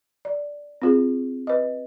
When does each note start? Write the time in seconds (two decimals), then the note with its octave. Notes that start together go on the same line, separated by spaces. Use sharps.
0.25 D5
0.82 C4 F4 G#4
1.47 B4 D#5